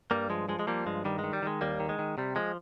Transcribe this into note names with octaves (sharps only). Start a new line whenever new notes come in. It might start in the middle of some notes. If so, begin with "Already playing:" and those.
G2 G3 A#3
F3 G#3
F3 G#3
G#3
F3 G3 A#3
G2 G#3
D#3 G3
D#3 G#3
G3
D#3 G#3
D#2 G3 A#3
D#3
G#3
D#3
C3 G3
F3 G#3